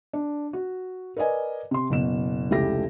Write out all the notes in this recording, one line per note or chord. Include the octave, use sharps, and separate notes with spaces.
D4
F#4
A#4 B4 D5 D#5 G#5
C3 C6
F#1 B2 E7
F1 C#2 E4 G4 A4 A#6